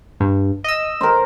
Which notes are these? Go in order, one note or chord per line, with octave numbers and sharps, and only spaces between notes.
G2
D#5 E6
A#4 C5